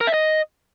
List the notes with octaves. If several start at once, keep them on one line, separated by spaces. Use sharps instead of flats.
A#4
E5
D#5